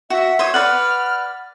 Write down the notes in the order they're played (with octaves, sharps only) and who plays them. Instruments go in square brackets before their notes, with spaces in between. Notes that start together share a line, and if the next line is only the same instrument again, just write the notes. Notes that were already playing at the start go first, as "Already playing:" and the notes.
[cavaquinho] F#4 [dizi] E5
[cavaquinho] C5 C#5 D#6
[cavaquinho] B4 D5 F#5 [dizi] F6